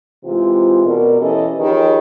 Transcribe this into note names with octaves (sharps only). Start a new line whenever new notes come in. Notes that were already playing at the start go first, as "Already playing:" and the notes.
C3 E3 G#3 C4 F4
B2 A#4 D5
E3 C#4 G4 A4 D#5
D#3 F3 G4 G#4 B4 C#5